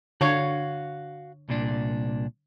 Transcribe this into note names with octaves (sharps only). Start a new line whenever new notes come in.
D3 F#4 C#5 F5
C2 A#2 D4